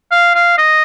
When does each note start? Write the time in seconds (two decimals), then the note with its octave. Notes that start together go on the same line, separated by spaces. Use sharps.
0.11 F5
0.35 F5
0.58 D#5